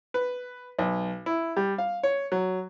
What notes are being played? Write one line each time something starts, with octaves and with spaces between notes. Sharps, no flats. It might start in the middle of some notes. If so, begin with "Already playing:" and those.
B4
B1
E4
G3
F5
C#5
F#3